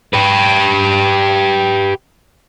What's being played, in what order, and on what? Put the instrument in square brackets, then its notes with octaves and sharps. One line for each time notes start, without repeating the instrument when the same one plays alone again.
[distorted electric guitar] G4 B4